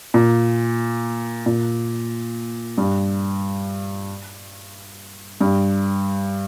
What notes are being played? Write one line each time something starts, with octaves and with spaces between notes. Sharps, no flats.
A#2
A#2
G2
G2